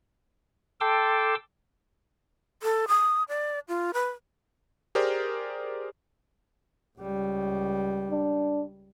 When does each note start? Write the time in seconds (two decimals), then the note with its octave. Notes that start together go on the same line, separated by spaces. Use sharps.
0.81 A4 G5 A5 C6 D6 E6
2.63 A4
2.88 D#6
3.29 D5
3.68 F4
3.94 B4
4.95 G4 G#4 A#4 C5 D5
6.98 C#2 G3
8.11 D4